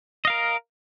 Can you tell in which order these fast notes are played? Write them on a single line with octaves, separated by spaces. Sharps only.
D#5 F5 A#4